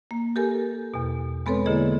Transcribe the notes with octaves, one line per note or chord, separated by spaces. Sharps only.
A#3
G4 A4 A#4 G#5
E2 B2
G#3 B3 C4 A4 B4 C#5
D3 A#3 E4 G#4 D#5